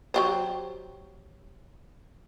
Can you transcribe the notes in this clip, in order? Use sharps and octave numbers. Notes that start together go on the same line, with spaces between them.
F#3 G4 C5